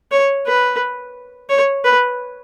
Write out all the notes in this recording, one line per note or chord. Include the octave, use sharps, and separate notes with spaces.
C#5
B4
C#5
B4